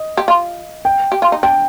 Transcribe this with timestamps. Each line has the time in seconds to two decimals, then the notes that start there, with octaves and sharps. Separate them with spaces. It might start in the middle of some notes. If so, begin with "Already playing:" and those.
Already playing: D#5
0.17 G4
0.28 F4
0.85 G5
1.12 G4
1.22 F4
1.32 D#4
1.43 D4 G5